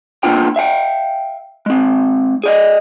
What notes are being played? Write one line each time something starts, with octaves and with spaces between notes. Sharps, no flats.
A#3 B3 D4 F4 G5
E5 F5 G5
G#3 C4
G#4 D5 D#5